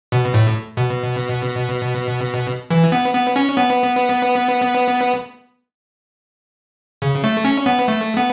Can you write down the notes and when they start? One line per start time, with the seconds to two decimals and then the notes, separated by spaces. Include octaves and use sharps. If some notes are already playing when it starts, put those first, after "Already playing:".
0.12 B2
0.34 A2
0.77 B2
2.70 E3
2.92 B3
3.14 B3
3.36 C#4
3.57 B3
7.02 C#3
7.24 A3
7.44 C#4
7.66 B3
7.88 A3
8.17 B3